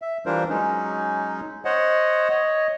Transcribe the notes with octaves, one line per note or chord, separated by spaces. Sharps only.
E5
E3 G3 D4 F4 A#4 C5
F#3 G#3 C#4 D#4
C5 C#5 D#5 F#5
C#5 D#5